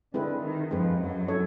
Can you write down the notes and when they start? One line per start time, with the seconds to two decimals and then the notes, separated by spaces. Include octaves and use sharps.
0.14 D3 G#3 C4 E4 G#4 B4
0.42 D#3
0.71 F2 F3 G#3 C4 E4 G#4 B4
1.00 F#2 F#3
1.28 C#4 E4 A4 C#5